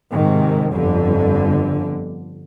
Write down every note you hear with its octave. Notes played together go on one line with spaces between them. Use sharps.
G#2 C3 D#3
G1 F2 D3